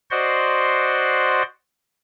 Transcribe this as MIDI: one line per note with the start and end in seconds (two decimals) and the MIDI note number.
0.11 1.42 66
0.11 1.42 72
0.11 1.42 74
0.11 1.42 75
0.11 1.42 78
0.11 1.42 84